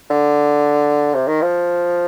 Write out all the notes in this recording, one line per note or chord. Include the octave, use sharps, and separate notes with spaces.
D3
C3
D#3
F3